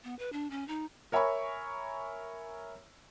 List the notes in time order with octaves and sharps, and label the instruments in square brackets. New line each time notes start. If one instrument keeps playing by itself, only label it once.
[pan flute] B3
B4
D4
C#4
D#4
[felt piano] A#4 C#5 E5 G#5 B5 C#6